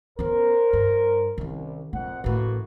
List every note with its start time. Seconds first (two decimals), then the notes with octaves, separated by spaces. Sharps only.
0.19 B3 C#4 A#4 C5
0.73 G2
1.38 C2 D#3 C#4
1.93 A#1 F2 F#5
2.24 A1 A2 A#3 F#4 B4